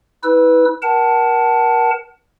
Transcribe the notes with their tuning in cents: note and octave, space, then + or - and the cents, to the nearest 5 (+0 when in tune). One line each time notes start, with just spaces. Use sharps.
E4 -30 B4 +0 E6 +0
A#4 +30 F#5 +30 A5 +0